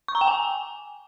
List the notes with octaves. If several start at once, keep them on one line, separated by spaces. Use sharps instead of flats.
C#6
A#5
G5
G#5